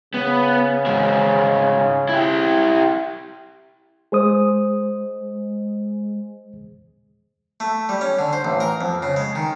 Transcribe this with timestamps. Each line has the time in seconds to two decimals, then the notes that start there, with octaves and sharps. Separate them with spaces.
0.14 C#3 B3
0.86 G#2 F#4
2.09 E4 G4
4.12 G#3 G#4 C5 D#6
7.60 A3
7.89 G3
8.01 C#4
8.19 D3
8.33 C5
8.45 A1
8.60 A#4
8.81 F2
9.03 C#3
9.16 G#3
9.35 D#3